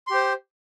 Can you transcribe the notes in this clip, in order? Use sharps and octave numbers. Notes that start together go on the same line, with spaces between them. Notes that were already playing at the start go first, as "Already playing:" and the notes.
G4 C5 C6